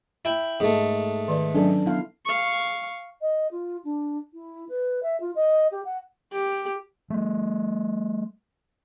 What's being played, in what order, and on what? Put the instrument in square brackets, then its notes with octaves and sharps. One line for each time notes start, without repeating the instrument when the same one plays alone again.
[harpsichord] E4 G5
[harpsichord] G#2 A3 [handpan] A#3 A4
[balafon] D#3 D5
[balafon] F#3 C#4 [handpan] D4 A4
[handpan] B3 E4 F5
[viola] F5 C#6
[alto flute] D#5
F4
D4
E4
B4
E5
F4
D#5
G4
F#5
[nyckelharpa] G4
[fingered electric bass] G3 A3